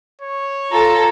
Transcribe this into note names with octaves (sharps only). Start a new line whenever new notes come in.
C#5
F4 A4 A#5